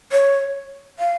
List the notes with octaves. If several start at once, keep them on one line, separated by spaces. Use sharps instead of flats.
C#5
F5